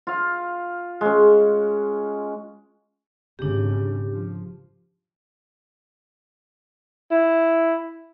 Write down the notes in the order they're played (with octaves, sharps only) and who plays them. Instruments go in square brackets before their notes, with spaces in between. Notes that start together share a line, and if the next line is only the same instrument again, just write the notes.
[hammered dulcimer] F4 F5
G#3 C#4
[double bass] G#1 C#3 [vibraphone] D4 G4
[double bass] F3
[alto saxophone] E4